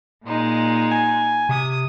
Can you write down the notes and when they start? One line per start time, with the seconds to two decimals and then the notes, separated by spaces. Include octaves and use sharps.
0.24 A#2 G#3 D#4
0.91 G#5
1.49 C3 D#6